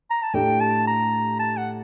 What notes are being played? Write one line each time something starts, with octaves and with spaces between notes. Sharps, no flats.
A#5
A5
A2 A3 D4 G4 G5
A5
A#5
A5
F#5